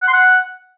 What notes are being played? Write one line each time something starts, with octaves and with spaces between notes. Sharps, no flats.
F#5
C6
F#5